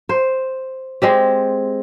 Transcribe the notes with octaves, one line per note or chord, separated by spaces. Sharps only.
C5
G#3 C4 G4